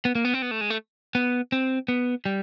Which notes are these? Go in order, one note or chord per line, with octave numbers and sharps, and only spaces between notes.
B3
A#3
B3
C4
B3
A3
G#3
A3
B3
C4
B3
G3